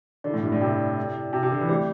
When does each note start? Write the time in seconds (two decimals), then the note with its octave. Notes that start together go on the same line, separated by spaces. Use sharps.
0.24 D3 E4 A4 D5
0.34 A2
0.43 G2
0.52 A2
0.61 C3
1.33 C3
1.43 C3
1.51 D3
1.61 E3
1.69 G3 A3 C4 G4 C5